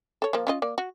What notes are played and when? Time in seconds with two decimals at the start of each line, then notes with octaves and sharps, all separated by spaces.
0.22 A4 C#5
0.33 F3 A#3
0.47 C#4 F4 D#5
0.62 A#3 D5
0.78 F#4